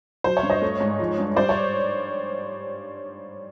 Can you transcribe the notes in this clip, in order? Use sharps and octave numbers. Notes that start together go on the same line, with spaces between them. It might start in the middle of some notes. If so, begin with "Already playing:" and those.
F#3 C5
C#5
G2
C#5 D#5
A3
G#2
F3
G2
G3 C5 D5
C#5